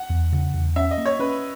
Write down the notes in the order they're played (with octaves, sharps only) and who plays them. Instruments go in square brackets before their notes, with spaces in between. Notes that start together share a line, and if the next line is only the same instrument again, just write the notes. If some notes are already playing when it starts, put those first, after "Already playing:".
Already playing: [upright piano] F#5
[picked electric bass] E2
C#3
E2
[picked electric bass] C#4 [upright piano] E5
[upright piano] D#5
[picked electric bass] A#3
[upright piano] C#5
[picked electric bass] C#4 [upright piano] B4